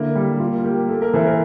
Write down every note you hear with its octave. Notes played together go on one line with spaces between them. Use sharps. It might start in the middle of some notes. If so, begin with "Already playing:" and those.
Already playing: D3 A#3 E4
G3
A#3 F4
A#3 G4
A#3 A4
A#4
E3 C5
A#4